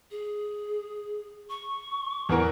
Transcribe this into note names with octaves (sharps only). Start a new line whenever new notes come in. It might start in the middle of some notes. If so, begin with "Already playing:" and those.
G#4
C#6
E2 E3 A#4